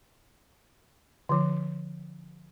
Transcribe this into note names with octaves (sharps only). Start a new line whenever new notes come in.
D3 F3